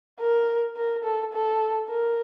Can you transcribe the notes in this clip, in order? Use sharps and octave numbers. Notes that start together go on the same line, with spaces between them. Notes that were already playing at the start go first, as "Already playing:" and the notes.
A#4
A#4
A4
A4
A#4